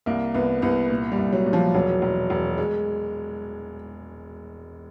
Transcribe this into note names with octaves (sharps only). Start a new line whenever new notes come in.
C2 A#3
C2 B3
C2 B3
A#2
G3
C2
F#3
A#2
F3
E1 F#3
E1
E1
G#3